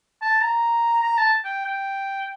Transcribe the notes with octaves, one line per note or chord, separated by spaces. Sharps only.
A5
A#5
A#5
A5
G5
G5